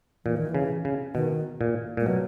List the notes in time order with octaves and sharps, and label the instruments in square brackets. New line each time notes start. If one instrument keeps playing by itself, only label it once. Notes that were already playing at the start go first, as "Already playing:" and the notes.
[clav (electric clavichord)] A#2 [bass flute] E3
[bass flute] D#3
E3
[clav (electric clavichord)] C#3
C#3
[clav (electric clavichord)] B2 [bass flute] D#3
[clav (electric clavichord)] A#2
[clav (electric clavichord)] A#2 [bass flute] G#3
[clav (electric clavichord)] B2 [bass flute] F#3